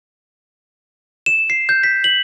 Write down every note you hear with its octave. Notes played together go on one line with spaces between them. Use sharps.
E7
C7
G6
B6
F#7